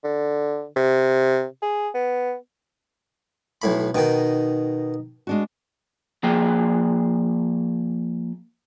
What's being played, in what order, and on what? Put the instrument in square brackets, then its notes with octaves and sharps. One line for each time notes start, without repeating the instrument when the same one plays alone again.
[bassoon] D3
C3
G#4
B3
[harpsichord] B1 A2 B5
[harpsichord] B2 D#3 [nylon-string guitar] D#4 G5
[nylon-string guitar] G#3 D4 F#4
[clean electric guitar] F3 A#3 G#4 G5